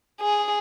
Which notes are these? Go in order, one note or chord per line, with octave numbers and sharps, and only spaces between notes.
G#4